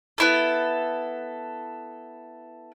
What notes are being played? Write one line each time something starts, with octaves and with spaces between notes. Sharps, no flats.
B3 E4 A4